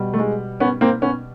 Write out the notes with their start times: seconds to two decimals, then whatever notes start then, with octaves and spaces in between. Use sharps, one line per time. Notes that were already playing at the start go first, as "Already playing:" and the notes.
Already playing: B2 G3
0.14 A3
0.18 G#3
0.60 B3 C#4
0.81 A#3 C4
1.02 B3 C#4